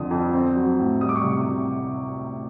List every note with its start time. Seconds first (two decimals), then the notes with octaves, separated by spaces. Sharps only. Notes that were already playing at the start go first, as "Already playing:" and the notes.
Already playing: F2 D3 D#6
0.11 F2
0.33 C4
0.56 F#3
0.79 A2
1.01 G3 D#6
1.09 D6
1.16 C#6
1.23 C3 D6
1.47 D2